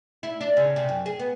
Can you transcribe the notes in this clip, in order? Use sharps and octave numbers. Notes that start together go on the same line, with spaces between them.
E4
D4
C#3
C3
F#2
G#4
B3